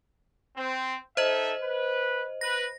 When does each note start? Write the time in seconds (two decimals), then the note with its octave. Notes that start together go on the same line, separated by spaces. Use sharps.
0.57 C4
1.17 D#4 A4 C5 D#5 E5
1.62 B4
2.41 B4 A#6